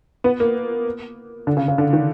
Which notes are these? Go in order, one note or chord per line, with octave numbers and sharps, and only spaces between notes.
B3
A#3
D3
C#3
C#3
D3
D#3